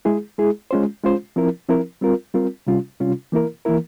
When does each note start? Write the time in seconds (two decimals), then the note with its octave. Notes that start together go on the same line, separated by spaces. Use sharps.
0.05 G#3 E4 G#4
0.38 G#3 E4 G#4
0.71 G#3 C#4 F4 C5
1.03 G#3 C#4 F4 C5
1.36 F3 C4 E4 A#4
1.69 F3 C4 E4 A#4
2.01 G3 C4 F4 A#4
2.34 G3 C4 F4 A#4
2.67 C3 G3 C#4 F4
3.00 C3 G3 C#4 F4
3.32 E3 A#3 E4 A#4
3.65 E3 A#3 E4 A#4